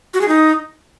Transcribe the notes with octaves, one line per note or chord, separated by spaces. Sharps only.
F#4
G#4
D#4